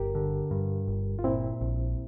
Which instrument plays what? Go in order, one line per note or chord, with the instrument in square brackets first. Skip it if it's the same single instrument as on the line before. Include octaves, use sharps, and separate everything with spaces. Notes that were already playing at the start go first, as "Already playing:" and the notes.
Already playing: [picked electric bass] G1 [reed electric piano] G4 A#4
[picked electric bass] D3
G2
G1
[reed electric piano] F4
[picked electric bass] A#2 [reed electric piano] C4 E4
[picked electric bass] A#1